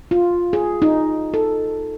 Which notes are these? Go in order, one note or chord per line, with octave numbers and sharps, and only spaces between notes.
F4
G#4
D#4
A4